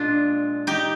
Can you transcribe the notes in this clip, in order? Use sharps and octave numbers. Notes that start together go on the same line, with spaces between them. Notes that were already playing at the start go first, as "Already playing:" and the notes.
Already playing: A#2 G#3 D4 F4
D#4 G4